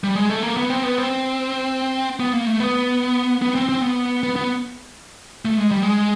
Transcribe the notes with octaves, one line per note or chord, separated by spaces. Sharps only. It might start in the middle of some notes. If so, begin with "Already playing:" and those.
G3
G#3
A3
A#3
B3
C4
B3
C4
B3
A#3
A3
B3
B3
C4
C4
B3
B3
B3
A3
G#3
G3
G#3